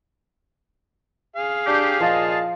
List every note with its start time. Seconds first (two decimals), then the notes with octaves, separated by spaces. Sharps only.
1.36 G#4 F5
1.66 D4 G4
2.00 A#2 F3 D#5 A5